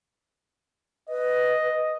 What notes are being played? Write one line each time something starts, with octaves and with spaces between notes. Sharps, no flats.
B4 D#5